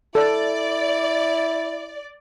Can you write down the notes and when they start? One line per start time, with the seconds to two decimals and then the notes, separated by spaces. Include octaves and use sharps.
0.15 E4 A4 D5